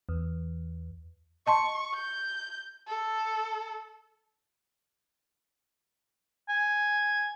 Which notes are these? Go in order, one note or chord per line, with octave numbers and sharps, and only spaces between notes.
E2
D#5 A5 C6 C#6
G6
A4
G#5